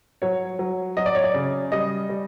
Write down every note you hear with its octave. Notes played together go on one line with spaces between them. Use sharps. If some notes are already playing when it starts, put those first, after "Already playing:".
F#3 C#5
F#3
F#3 D#5
D5
C#5
D5
C#3
G3 D#5
G3